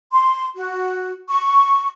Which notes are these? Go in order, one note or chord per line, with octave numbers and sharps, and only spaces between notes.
C6
F#4
C#6